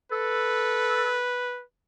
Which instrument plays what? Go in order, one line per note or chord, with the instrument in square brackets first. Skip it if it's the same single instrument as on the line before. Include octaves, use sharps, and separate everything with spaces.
[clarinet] A4 [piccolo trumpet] B4